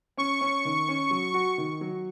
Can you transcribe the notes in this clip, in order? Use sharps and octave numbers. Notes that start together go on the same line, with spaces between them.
C#4 C#6
C#4
D#3
C#4
F#3
F#4
D#3
F#3